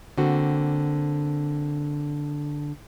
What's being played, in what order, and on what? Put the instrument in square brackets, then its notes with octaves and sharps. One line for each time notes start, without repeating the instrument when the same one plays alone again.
[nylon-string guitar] D3 A#3 C4 F#4